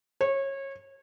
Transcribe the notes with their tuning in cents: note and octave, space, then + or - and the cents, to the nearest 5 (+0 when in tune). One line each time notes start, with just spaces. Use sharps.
C#5 -25